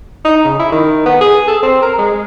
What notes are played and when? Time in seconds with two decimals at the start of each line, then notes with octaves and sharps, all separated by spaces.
0.25 D#4
0.45 C#3
0.59 E4
0.72 D#3
1.06 B3
1.21 G#4
1.48 A4
1.63 C4
1.82 A#4
1.98 G#3